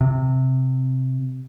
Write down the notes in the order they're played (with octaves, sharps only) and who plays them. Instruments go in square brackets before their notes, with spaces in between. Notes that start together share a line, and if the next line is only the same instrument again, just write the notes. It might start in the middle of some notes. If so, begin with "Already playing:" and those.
[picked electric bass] C3